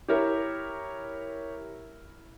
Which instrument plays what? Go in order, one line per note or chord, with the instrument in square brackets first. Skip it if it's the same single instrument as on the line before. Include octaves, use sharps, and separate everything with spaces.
[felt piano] E4 A#4 [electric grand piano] G4 C#5